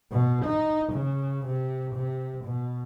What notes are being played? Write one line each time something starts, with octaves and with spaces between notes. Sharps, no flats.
B2
D#4
C#3
C3
C3
B2